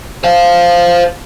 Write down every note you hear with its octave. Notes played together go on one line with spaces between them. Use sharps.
C5 F5